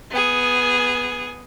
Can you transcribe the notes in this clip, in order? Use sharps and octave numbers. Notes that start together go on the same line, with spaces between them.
B3 G#4